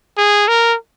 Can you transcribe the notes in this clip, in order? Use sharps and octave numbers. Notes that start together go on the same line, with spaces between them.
G#4
A#4